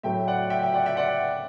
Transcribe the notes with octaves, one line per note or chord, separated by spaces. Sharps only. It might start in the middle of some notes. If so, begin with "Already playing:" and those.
A2 F#3 A3 E5 G5
D5 F#5
E5 G5
E5 G5
D5 F#5
E5 G5
D5 F#5